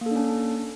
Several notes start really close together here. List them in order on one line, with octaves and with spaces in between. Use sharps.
A#3 A4 D4 C#4